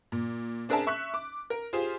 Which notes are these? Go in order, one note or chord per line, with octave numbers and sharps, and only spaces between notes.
A#2
C4 D4 G#4 A#4 E5 A5
E5 C#6 F#6 B6
D6
A#4
F4 G4 G#4 C5